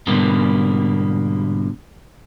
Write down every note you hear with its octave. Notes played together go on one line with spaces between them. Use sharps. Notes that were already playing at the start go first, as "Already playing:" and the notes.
G#2 B2 D3 G3 A#3 B3